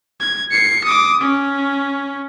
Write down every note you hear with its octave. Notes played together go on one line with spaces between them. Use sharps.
G#6
C7 C#7
D6 D#6
C#4